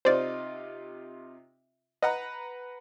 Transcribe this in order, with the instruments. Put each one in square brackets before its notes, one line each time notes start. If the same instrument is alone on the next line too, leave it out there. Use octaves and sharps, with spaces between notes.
[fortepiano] C3 D#4 F4 [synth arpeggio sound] C5 D5
[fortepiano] B4 F#5 A#5 [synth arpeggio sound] D#5